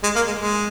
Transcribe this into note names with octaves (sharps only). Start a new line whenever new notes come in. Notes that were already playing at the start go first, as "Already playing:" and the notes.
G#3
A#3
G#3
G#3